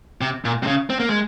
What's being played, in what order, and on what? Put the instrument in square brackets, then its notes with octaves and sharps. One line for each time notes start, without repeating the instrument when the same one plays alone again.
[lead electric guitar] C3
A#2
C3
C#3
C4
A#3
G#3